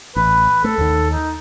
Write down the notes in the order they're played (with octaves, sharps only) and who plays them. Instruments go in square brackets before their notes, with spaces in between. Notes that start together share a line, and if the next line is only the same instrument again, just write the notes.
[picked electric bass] A1 [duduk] B4
[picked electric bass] A3 [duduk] A4
[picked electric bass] D#2 D#3
[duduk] D#4